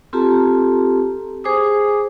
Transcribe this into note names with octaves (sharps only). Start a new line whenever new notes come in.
C4 F4 G4 A4 A5 A#5
G#4 C5 G#5 D6 D#6